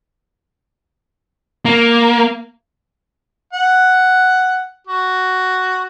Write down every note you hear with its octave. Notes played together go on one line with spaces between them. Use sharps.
A#3
F#5
F#4